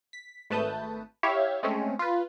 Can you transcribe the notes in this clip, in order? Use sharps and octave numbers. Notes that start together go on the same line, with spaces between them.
B6
G#1 A3 B4 A5 D#6 G6
E4 G4 C#5 E5 F5
G#3 A3 C4 C#4
F4 B4